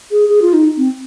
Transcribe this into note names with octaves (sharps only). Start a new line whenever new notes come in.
G#4
G#4
F4
D#4
C4